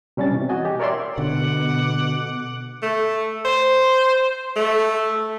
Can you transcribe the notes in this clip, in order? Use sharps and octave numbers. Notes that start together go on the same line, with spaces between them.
C3 G3 C#4 D4 A6
B2 E3
F#4 D#5 G#5
G4
A#4 C#5 D5 E5 C6
B2 D3 F#5 D6
A3
C5
A3